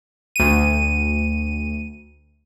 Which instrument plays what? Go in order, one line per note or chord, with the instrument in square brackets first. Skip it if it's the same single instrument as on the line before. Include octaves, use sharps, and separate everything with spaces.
[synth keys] D2 D#7